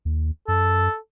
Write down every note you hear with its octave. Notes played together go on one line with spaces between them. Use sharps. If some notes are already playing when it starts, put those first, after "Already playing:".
D#2
F#2 A4